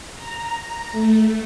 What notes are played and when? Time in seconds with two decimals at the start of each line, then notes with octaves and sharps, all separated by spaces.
0.14 A#5
0.92 A3